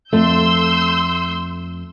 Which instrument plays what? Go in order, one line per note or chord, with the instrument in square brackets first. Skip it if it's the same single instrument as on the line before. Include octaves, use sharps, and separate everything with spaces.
[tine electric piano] F2 [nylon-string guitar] A3 [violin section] C6 E6 G6